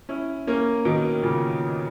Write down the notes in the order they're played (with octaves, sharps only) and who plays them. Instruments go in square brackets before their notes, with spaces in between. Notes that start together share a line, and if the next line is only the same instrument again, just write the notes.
[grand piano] C#4 E4
A#3 C#4
B2 D#3
A#2 C#3